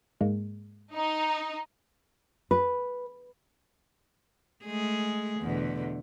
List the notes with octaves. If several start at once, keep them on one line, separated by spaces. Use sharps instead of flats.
G#2 G#3 A#3
D#4
B4
G#3 A3 G#4
E2 B2 D3